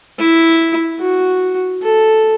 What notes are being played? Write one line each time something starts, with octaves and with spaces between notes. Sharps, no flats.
E4
F#4
A4